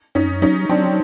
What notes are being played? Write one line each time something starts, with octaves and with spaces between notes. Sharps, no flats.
F#2 C#4 D#4
F#3 C#4 D#4
F#3 C4 D4